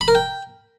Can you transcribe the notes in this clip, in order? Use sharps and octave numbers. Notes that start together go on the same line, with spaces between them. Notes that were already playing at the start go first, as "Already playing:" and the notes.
B5
A#4
G5